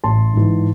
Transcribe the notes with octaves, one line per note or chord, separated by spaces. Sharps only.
A1 A5 C6
G#2 E3